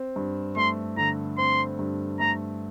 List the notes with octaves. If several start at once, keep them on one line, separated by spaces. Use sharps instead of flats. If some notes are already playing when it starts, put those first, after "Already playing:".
Already playing: C4
G2
A3 C6
D3 A#5
C4 C6
G2
A3 A#5